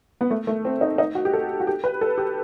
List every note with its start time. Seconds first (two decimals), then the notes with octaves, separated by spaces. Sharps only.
0.21 B3
0.31 A3
0.47 A3
0.65 C4
0.81 D#4
0.98 D#4
1.15 F#4
1.25 G4
1.33 A4
1.60 F#4
1.67 G4
1.84 B4
2.01 A4
2.18 G4